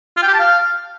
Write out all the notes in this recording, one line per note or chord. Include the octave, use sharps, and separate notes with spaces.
F4
G5
G4
A5
F5